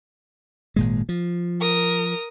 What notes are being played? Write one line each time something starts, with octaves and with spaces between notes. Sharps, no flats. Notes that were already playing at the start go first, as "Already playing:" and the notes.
G#1 A#2 G#3
F3
A#4 D#6